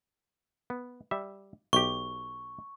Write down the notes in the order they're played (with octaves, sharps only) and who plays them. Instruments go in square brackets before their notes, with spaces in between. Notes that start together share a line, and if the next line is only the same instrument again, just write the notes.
[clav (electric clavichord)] B3
G3 E5
[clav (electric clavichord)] B1 G4 [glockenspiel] C#6